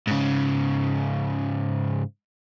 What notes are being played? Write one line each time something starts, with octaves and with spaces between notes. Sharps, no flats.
G#2 C#3